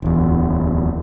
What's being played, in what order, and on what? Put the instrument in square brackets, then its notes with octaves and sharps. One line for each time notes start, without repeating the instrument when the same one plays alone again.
[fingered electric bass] D1 E2